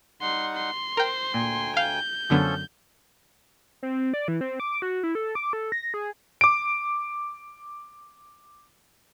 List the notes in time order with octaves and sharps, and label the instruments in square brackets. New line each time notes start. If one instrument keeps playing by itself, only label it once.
[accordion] G3 D#4 F#5 [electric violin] C6
[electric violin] C6
[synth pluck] A#4 G5 [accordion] C5
[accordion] D2 G5 G#5 [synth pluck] A#2
[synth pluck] F5 [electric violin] G6
[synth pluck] F#2 D3 B3 [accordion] F3 C#4 A4
[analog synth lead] C4
D5
E3
C4
D6
F#4
E4
A4
D6
A4
A#6
G#4
[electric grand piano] D6 D7